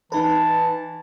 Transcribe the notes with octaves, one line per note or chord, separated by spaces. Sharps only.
E3 D#4 B4 A5